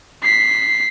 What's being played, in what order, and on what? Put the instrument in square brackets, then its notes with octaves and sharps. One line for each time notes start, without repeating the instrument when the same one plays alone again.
[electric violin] B6 C7